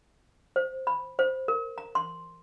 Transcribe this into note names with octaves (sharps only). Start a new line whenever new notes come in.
C5
B5
C5
A#4
A#5
C6